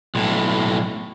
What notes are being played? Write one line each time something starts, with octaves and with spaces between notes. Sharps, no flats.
B1 A2